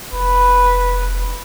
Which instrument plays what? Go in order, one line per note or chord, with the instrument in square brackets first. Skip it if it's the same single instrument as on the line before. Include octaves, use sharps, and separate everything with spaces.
[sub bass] F1 [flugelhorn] B4